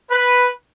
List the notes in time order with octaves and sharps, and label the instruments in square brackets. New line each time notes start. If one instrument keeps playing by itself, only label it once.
[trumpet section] B4